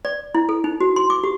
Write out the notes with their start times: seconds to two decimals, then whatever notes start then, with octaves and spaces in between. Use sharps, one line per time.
0.05 D5
0.35 E4
0.49 A4
0.64 D#4
0.80 F#4
0.96 C6
1.10 D6
1.24 G4